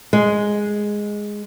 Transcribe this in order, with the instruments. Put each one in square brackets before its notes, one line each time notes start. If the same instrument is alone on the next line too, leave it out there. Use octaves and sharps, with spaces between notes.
[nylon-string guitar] G#3